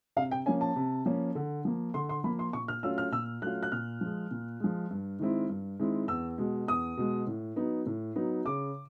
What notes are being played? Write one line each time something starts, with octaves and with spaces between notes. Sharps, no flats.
C3 F5
G5
F3 A#3 C#4 G#5
A5
C3
F3 A#3 C#4
D3
F3 A#3
D3 C6
C6
F3 A#3 B5
C6
A#2 C#6
F6
F#3 A3 C#4 F4 E6
F6
A#2 E6
F#3 A3 C#4 F4 F#6
F#6
A#2 F6
F3 G#3
A#2
F3 G#3
G2
D#3 G#3 C4 E4
G2
D#3 G#3 C4 E4
E2 E6
B2 G#3
E2 D#6
B2 G#3
A2
F#3 B3 D#4
A2
F#3 B3 D#4
C#3 D6